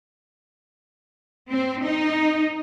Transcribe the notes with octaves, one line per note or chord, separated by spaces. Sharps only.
C4
D#4